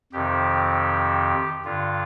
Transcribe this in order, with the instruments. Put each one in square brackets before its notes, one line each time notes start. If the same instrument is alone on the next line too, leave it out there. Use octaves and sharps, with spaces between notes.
[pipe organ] F2 C3 D#3 G4
G2 D3 F4